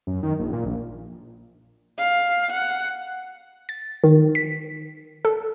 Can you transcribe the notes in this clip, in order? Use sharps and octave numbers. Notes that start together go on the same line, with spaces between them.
F#2
D#3
A#1
A#2
A#1
F5
F#5
A6
D#3
B6
A4